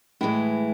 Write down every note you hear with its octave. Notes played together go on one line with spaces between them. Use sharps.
A2 E3 G#3 E4